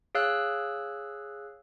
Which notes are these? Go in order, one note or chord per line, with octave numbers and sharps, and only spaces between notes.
G#4 C#5 F5 E6 F#6